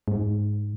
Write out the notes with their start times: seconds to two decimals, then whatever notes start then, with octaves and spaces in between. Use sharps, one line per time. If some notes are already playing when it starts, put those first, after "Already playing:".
0.08 G#2